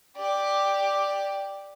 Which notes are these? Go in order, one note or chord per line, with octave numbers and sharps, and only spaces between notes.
G4 D5